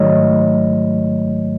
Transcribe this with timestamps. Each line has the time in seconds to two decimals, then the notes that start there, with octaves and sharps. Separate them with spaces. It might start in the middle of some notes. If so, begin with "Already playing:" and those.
Already playing: G#2 D#3 F#3 A3 C#5 D#5